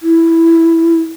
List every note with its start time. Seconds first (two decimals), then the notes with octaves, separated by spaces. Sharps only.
0.02 E4